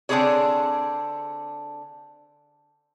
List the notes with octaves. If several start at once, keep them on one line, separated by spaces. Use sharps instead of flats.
D3 C4 D4 E4 G#4 C#5